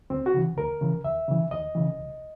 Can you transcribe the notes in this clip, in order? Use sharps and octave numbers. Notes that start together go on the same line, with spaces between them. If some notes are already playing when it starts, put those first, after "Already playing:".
D2 C4
F#4
C#3 E3
D2 A#4
C#3 E3
D#2 E5
C#3 E3
D#2 D#5
C#3 E3
C2